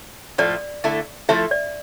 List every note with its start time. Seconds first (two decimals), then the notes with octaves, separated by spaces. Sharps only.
0.38 A2 F3 A3 D5
0.84 D3 A3 E4 A4
1.29 F3 A3 E4 A4 E5
1.51 D5